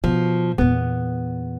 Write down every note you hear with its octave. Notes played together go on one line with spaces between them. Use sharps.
B2 F3
E2 A#2 B3